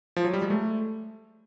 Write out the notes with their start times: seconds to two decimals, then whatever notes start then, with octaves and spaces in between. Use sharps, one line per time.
0.16 F3
0.25 F#3
0.33 G3
0.42 G#3
0.50 A3